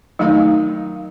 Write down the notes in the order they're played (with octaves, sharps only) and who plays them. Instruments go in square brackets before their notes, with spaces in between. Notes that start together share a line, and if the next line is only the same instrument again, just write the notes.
[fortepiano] D#3 D#4 [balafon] F#3 A3 F5